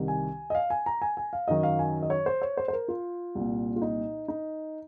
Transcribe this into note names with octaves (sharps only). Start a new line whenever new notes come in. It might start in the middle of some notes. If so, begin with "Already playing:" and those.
Already playing: C2 C3 D#3
G#5
D#5
F5
G#5
A#5
G#5
G#5
F5
F#2 D#3 D#5
F5
G#5
D#5
C#5
C5
C#5
C5
C5
A#4
F4
C2 A#2
F4
D#4
D#4